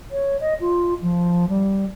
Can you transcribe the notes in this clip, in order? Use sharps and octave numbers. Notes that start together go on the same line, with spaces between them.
C#5
D#5
F4
F3
G3